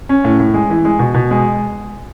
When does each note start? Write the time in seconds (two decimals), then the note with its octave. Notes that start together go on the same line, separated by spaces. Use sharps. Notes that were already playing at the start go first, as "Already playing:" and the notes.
0.09 C#4
0.25 A2
0.40 A2
0.54 G#3
0.70 E3
0.85 G#3
0.99 B2
1.14 B2
1.31 G#3